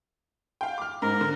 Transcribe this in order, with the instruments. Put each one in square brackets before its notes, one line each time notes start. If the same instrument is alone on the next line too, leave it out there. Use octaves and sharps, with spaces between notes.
[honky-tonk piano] F5 G5
D6 F6
[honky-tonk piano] G#2 [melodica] A#4
[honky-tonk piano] D3